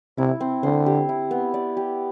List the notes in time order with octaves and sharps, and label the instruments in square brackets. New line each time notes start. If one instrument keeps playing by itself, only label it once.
[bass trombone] C3 [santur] E4
[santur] C4
[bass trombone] D3 [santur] C5
[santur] G4
E4
B3
D5
G4